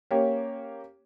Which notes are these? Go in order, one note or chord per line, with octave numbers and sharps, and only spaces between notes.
A#3 C#4 G4 C#5